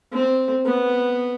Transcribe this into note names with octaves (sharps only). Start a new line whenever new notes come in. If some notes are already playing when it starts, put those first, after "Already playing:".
C4
B3